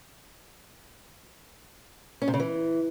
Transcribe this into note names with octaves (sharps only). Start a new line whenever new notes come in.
C#4
C3
C#3
E3